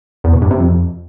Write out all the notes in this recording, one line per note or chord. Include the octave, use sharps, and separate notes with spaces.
E2
B2
G2
C3
F2